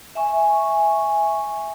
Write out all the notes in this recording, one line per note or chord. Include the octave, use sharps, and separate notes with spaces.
E5 G#5 C#6